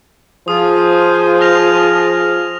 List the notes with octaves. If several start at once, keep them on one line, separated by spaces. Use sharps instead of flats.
F3 F4 G#4 C5 D#6
F6 A#6 F7